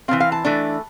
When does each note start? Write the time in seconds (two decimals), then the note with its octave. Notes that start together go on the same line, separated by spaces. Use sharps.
0.08 E3 A3 C4 F5
0.20 F5
0.32 A5
0.45 E3 A3 D4